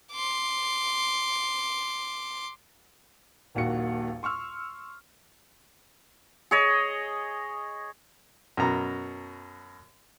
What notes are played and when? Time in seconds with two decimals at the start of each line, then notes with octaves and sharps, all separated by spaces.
0.13 C6 D6
3.55 D#1 A#1 D#2 A#3 F#4 C#7
4.23 C6 C#6 E6 F6
6.51 G#4 C#5 D#5
8.57 F#2 B2 A#5